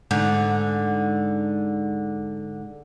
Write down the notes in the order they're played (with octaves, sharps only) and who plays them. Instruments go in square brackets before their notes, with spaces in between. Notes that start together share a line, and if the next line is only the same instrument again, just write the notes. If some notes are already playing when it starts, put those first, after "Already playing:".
[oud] G#2 D3